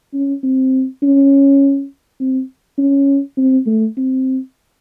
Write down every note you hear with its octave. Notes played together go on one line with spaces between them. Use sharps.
C#4
C4
C#4
C4
C#4
C4
A3
C4